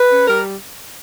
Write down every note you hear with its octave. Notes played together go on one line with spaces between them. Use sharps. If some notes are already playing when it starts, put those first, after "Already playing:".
Already playing: B4
C#4
G3 A#4